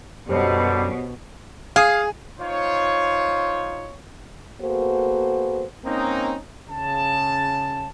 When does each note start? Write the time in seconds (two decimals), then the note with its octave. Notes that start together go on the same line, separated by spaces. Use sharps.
0.29 F#2 B2 D3 G3 G4 C5 C#5
1.76 G#4 F5 D#6
2.40 D#4 F4 C5 C#5
4.62 A#3 B3 F#4 G#4 A4 C5
5.85 A#3 C4 C#4 D#4
6.70 C#3 A5